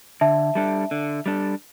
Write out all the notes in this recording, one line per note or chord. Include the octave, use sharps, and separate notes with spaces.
D3 E5 A5
G3 D4 A4
D3
G3 D4 A4